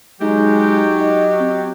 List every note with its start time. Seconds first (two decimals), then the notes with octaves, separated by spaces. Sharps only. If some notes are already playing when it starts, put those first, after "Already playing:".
0.21 F#3 G#3 D#4 G4
1.00 D#5
1.39 C4